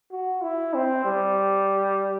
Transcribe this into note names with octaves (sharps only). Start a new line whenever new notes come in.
F#4
E4
C4
G3